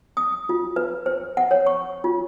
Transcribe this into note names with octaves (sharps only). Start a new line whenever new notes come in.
D#6
F4
B4
C5
F#5
C#5
C#6
F4